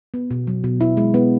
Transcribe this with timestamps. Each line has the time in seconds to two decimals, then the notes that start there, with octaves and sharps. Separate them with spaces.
0.14 B3
0.31 B2
0.47 F#3
0.64 B2
0.81 E4
0.97 G#3
1.14 B3